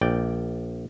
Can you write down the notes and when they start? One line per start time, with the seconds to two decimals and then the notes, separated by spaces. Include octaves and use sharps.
0.01 A#1 D5 G5